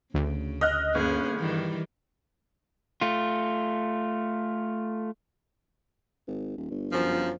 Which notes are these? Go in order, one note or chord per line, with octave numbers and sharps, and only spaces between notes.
D2 C#3
D#5 F6 F#6
G1 A#3 C#4 G#4
D#3 E3 G3
A3 F4
G#1
D#1
G1
F#2 F3